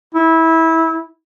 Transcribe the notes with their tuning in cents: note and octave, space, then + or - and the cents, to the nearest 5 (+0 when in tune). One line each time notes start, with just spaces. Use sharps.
E4 -20